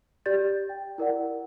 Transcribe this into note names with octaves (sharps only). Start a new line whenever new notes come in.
G4 D5 G6 A6
G5
E4 A#4 D5 F#5